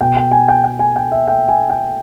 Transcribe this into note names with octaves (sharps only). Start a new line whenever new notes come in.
B2 G5
G5
G#5
G5
G5
G#5
G5
E5
G5
G#5
G5